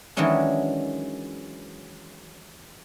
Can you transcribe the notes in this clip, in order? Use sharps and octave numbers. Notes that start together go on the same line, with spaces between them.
D#3 E3 F#3 G#3 C#4 D4